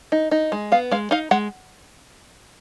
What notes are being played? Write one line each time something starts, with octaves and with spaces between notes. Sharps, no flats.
D#4
D#4
G#3
B3 F5
G#3 F5
D#4 F5
G#3 F#5